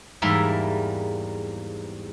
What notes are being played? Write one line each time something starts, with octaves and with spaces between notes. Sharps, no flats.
E2 G#2 G3 A#3 A#4 E5